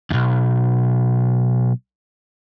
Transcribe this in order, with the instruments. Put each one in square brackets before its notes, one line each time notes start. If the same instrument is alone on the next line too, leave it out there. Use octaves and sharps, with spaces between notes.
[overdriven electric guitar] B1 E2